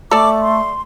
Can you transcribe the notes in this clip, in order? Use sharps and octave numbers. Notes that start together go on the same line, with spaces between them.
A3 A4 D5 D6
C6